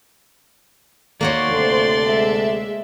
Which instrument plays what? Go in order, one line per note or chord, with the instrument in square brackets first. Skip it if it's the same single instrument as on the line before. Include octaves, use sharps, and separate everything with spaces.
[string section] D#2 [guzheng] A#3 F#4 C#5 [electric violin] D5 C6
[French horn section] D2 C3 A4 [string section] C5
[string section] G#3 E5